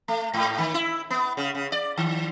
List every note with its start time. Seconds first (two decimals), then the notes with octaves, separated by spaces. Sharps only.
0.08 A3
0.34 G#2
0.58 D#3
0.74 E4
1.10 B3
1.37 C#3
1.55 C#3
1.72 D5
1.97 D#3